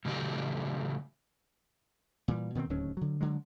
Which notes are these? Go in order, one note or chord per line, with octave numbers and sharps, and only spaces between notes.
A2 C#3 E3 F#3 G4
A#2 E3 G3
B2 D#3 F3 C4
D1 D#2 F#3 C#4
D3 F#3
D3 F#3 G#3